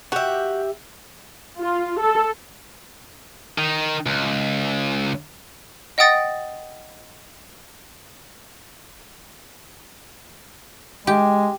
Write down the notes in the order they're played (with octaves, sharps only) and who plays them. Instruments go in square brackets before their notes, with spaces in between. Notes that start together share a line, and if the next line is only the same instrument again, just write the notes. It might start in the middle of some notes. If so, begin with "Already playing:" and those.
[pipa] F#4 [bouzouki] G4 E5
[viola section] F4
A4
[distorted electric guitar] D#3
C#2
[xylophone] D#5 F#5 G5 D#6 A6 A#6
[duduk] G#3 [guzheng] G4